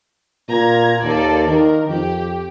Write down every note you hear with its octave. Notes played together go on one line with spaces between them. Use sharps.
A#2 A#5 G#6
D#2 A#3 A4 D5
D#3 A#4
F2 G4